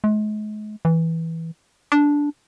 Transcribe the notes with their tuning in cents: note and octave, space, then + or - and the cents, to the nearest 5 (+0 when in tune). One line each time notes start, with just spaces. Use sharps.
G#3 +40
E3 -10
D4 -10